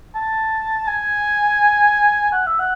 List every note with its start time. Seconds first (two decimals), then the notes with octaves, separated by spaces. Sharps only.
0.15 A5
0.87 G#5
2.32 F#5
2.47 E5
2.59 F#5